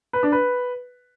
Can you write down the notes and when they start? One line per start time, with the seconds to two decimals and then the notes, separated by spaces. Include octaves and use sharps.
0.13 B4
0.23 D4
0.32 B4